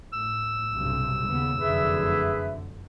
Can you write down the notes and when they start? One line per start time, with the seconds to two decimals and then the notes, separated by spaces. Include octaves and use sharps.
0.13 A2 E6
0.73 B1 G2 C3
1.29 D#2 C#3 B3
1.61 F1 F#2 D3 G#4 B4 E5